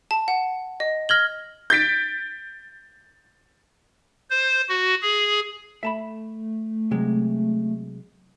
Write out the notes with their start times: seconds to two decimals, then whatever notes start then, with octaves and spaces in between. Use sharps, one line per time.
0.11 A5
0.28 F#5
0.80 D#5
1.09 F6 G#6 A#6 F#7 G7
1.70 G6 A6 B6 D7
4.30 C5
4.69 F#4
5.02 G#4
5.83 A3 E5 A5 B5
6.91 C3 F#3 G#3